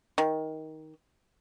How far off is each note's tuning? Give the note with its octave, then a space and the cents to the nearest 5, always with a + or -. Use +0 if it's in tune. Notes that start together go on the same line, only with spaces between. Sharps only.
D#3 +15